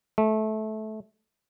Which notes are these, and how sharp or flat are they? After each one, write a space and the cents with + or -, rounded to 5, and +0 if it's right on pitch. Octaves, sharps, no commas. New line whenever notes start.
A3 -20